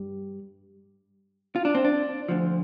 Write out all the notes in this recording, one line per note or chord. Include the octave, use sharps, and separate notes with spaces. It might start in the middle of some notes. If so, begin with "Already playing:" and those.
Already playing: G2 G3
F4
D4
C4
D4
D2 D3 F3